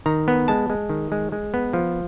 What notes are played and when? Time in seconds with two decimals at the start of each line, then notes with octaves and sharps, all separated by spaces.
0.06 D#3 A#5
0.28 B3
0.48 G#3 A5
0.70 G#3
0.90 D#3
1.12 G#3
1.32 G#3
1.54 B3
1.73 F3